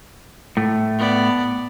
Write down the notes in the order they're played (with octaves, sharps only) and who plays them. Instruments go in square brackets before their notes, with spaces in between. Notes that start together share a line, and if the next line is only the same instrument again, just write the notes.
[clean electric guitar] A2 A3
[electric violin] B3 D5